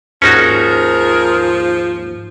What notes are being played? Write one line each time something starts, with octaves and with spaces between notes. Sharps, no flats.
D#2 G#2 F3 C#4 D#4 F#4 G#4 A#4